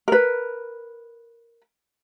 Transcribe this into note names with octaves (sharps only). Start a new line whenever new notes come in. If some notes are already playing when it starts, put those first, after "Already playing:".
A#4 B4